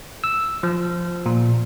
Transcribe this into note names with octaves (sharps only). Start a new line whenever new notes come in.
E6
F3
A#2